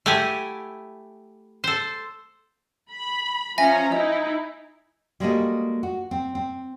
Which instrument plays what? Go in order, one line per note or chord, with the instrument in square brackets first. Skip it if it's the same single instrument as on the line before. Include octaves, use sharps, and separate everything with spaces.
[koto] A3 E4 G4 F#5 G#5
A4 C5
[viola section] B5
[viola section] F3 C#4 A#5 [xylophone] E5 G#5 A#6
[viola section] D#4 E4 [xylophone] D#5
[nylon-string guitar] G3 G#3 A#3 F#4 A4 D#5
F#4
C4
C4